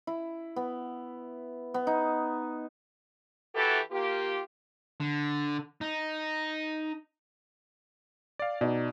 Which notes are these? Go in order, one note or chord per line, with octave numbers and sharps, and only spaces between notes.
E4
B3
B3
D#4
E3 E4 F#4 G4 A4
A#3 F4 G4
D3
D#4
D5 F5
B2 D#4 D5